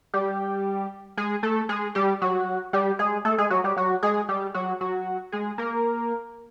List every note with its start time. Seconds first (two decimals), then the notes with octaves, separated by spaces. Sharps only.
0.14 G3 G4
1.17 G#3 G#4
1.43 A3 A4
1.69 G#3 G#4
1.95 G3 G4
2.22 F#3 F#4
2.73 G3 G4
2.99 G#3 G#4
3.25 A3 A4
3.38 G#3 G#4
3.50 F#3 F#4
3.64 G3 G4
3.77 F#3 F#4
4.03 G#3 G#4
4.29 G3 G4
4.54 F#3 F#4
4.81 F#3 F#4
5.32 G#3 G#4
5.58 A#3 A#4